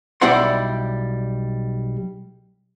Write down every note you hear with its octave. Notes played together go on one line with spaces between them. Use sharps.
B1 G3 E4 D5 F#5 C6